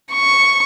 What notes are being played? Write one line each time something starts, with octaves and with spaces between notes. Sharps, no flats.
C#6